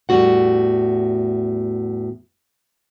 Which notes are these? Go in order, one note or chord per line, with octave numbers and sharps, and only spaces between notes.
E2 A2 G3 C4 F#4 F#5